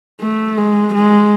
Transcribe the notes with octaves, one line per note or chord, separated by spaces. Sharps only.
A3
G#3
G#3